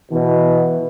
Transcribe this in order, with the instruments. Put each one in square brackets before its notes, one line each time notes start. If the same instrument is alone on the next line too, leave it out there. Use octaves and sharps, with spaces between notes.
[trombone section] B2 [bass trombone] E3